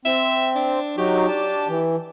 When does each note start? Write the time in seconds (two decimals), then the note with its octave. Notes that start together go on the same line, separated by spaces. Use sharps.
0.05 C4 E5
0.55 D4
0.98 F#3 D#4 F#4 G4
1.28 D4 A5
1.69 E3